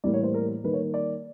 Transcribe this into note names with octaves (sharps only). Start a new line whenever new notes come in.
A2 E3 G3 A#3 D5
C#5
C5
A#4
D#3 G3 A#3 B4
C#5
D5